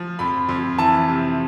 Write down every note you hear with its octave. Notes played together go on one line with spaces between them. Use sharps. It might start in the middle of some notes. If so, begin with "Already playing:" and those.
Already playing: F3
F2 B5
F2
E3 A5
C3